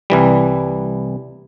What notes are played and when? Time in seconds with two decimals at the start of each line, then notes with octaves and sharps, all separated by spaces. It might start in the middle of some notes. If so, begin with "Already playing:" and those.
0.10 C2 E3 G3